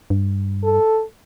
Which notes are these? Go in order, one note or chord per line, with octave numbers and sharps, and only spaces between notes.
G2
A4